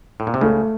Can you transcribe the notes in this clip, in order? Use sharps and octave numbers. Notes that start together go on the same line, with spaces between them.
A2
A#2
C3
C#2 C#3 A3